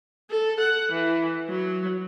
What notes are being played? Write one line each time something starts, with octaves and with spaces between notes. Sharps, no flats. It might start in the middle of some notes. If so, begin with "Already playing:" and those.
A4
F#5
E3
F#3